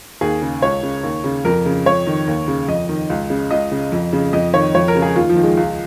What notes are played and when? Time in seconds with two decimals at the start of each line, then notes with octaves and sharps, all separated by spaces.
0.21 D#2 G#4
0.42 C#3
0.62 C#2 C#5
0.83 C#3
1.03 D#2
1.24 C#3
1.45 F2 A#4
1.65 C#3
1.86 F2 C#5
2.06 D#3
2.27 D#2
2.48 C#3
2.68 F2 D#5
2.89 D#3
3.10 C#2
3.30 C#3
3.51 C#2 D#5
3.71 C#3
3.92 F2
4.13 C#3
4.33 F2 D#5
4.54 D#3 C#5
4.75 F2 C#5
4.88 A#4
4.95 C#3
5.02 G#4
5.15 D#2 F4
5.29 F3
5.36 D#3
5.43 G#3
5.57 C#2